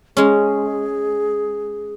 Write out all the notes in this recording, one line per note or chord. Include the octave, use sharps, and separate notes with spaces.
G#3 C#4 G#4